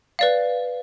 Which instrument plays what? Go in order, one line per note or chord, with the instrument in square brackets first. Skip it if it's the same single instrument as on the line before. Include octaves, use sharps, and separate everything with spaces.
[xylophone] B4 D5 F5